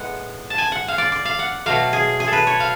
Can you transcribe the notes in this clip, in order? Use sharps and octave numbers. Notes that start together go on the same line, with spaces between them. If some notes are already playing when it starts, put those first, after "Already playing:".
Already playing: A2 G#3 B3 F#5
A5
G#5
F#5
F5
D5
D5
F5
F#5
B2 F#3 A3 F5
G#4
G#4
A4
B4
C#5
F5